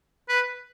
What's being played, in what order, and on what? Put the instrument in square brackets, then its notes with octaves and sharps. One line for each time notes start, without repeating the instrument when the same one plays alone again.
[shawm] B4